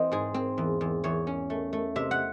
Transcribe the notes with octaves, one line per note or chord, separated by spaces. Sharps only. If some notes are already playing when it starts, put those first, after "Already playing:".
Already playing: E3 C4 D#5
G#2 G#4
C4
E2
E2
E2 C#5
C#4
A3
A3
C3 E5
F#5